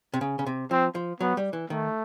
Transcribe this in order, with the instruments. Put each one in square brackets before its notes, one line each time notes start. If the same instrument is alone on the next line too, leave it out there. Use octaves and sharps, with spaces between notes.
[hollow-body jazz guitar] C3
C#3
C#3
C3
[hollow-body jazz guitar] F3 [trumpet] C4
[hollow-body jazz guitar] F3
[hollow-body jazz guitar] F#3 [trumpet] B3
[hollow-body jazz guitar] G3
E3
[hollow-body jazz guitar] D#3 [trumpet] A3